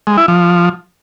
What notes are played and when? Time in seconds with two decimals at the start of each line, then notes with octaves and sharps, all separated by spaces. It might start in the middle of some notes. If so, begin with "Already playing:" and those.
0.07 G#3
0.18 E4
0.28 F3